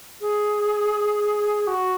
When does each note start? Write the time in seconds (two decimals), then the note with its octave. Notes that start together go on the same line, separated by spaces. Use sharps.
0.21 G#4
1.67 F#4